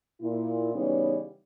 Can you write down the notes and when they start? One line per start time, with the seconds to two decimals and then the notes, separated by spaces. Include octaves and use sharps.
0.21 A#2 E4
0.74 C#3 E3 G3 B3 C#4 D#4